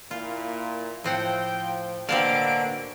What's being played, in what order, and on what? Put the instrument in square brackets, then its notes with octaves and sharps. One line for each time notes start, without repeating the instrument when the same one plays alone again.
[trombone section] A#2 A#3 E4 [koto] F4
[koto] A2 C4 F#5 [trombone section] F3 [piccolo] G5
[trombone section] B2 A#3 [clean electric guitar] D3 [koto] C4 D5 F5 [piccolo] D7